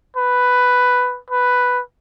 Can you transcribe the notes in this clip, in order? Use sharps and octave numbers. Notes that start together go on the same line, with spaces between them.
B4
B4